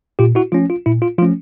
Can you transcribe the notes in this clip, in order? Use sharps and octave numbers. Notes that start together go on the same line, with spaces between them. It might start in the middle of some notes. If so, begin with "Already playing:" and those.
A#2 F4 G4
E4 F#4
F3 A3 C#4 F4
F4
A#2 E4
F4
F3 A3 C#4 F4